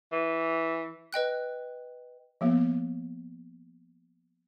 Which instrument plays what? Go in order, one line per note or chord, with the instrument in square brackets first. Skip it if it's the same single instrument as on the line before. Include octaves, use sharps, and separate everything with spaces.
[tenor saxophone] E3
[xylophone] B4 D#5 G5 F#6
[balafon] F3 A#3 B3